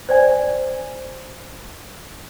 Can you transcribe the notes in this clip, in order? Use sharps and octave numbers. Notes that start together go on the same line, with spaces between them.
C5 D5 G#5